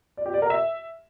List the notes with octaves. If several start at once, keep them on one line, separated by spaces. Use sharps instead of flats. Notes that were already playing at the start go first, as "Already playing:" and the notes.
D5
G4
D5
A#4
E5